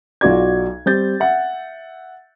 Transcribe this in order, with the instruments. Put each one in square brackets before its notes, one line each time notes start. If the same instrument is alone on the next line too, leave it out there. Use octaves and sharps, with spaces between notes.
[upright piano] B1 F4 F#4 D5 G#6
G3 C4 G6 A6
E5 F#5